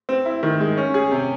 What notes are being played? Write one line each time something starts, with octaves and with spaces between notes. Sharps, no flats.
C4
E4
D#3
G#3
C#4
G#4
C3